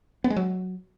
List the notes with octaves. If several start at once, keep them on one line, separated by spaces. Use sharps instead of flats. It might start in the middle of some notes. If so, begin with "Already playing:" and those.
B3
G#3
F#3